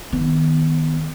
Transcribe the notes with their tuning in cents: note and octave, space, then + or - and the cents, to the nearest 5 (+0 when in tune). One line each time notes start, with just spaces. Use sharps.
D#3 +10 B3 +0